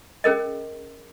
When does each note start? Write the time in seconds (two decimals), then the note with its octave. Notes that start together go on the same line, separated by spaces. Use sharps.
0.24 C#4 G#4 A#4 D#5